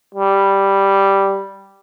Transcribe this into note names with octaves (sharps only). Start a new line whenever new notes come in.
G3